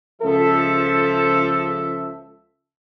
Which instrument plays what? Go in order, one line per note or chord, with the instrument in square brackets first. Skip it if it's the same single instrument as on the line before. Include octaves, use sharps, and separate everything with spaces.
[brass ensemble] C#2 F3 A4 E5